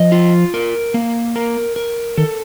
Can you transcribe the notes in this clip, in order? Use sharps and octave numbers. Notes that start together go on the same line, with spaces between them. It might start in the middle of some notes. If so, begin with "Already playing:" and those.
Already playing: F3 D#5
F4
A#4
A#3
A#4
A#4
D#3 A4